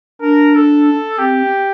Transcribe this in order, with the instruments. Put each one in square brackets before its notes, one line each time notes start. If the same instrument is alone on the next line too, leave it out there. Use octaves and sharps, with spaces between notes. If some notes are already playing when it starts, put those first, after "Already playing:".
[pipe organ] D4 [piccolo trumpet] A#4
[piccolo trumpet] A4
[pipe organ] C4 [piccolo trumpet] G4